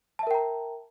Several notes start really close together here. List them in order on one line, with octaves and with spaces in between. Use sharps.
A5 E5 A#4 G5 A#5